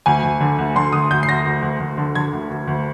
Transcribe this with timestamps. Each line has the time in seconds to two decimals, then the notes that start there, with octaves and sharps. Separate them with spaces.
0.06 D2 G#5
0.23 D2
0.41 D3
0.58 D2
0.75 D3 C6
0.93 D2 D#6
1.10 D2 G6
1.23 C7
1.28 D2 A#6
1.45 D2
1.62 D2
1.80 D2
1.98 D3
2.15 D3 G#6
2.33 D2
2.50 D2
2.67 D2